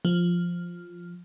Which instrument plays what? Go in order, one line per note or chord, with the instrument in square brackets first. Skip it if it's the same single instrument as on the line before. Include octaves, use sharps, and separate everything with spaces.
[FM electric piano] F3